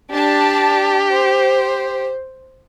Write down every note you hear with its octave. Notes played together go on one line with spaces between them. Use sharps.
D4 G4 A5
C5